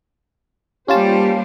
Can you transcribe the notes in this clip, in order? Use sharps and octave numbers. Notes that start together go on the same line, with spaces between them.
G3 A#3 C#4 F4 G4 C5 A5